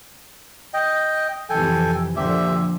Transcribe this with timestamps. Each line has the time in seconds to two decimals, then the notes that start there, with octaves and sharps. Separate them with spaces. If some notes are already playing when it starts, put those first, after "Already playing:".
0.74 D#5 G5
1.50 F2 C3 E3 A4 G5 G#5
2.16 A#2 D3 F3 G4 E5